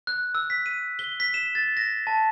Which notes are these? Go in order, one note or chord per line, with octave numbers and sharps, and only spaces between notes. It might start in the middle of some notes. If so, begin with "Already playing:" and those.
F#6
E6
B6
D#7
G7
B6
E7
A6
A#6
A5